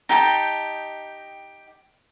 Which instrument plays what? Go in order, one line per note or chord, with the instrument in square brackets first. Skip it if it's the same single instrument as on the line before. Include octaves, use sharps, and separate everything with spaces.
[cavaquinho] D#4 G4 G5 A5